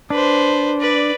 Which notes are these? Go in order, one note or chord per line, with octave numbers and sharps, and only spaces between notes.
D4 B4 C5
B4 D5